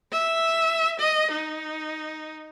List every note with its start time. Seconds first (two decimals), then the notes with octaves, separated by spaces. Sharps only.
0.12 E5
0.99 D#5
1.31 D#4